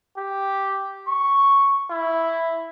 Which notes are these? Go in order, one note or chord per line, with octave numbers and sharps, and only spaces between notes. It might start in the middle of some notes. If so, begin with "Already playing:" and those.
G4
C#6
E4